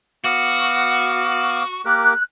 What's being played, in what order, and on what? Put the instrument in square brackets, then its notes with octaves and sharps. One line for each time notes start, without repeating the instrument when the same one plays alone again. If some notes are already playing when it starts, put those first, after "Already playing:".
[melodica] B3 F5 D6 [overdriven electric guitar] F#4
[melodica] A#3 G4 A#4 [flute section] F#6